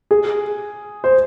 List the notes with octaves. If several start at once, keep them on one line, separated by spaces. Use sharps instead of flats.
G#4
C5